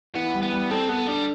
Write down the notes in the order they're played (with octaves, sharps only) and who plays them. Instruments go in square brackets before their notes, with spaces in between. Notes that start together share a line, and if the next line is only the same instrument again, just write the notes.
[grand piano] E3 [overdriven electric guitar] B3
[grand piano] G3
[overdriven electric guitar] B3
[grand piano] G3
[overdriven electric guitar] C4 [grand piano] A4
[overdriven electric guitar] B3 [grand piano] A4
[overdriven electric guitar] G3 [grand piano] D4